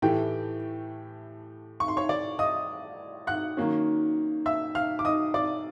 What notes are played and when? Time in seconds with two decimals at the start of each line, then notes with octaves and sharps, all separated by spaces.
0.02 A2 E3 A3 G4 G5
1.80 C#6
1.88 C6
1.97 C#5 C#6
2.09 D5 D6
2.39 D#5 D#6
3.27 F#5 F#6
3.57 D#3 F#3 A#3 C#4
4.46 E5 E6
4.75 F5 F6
4.99 D6
5.05 D#5 D#6
5.34 D5 D6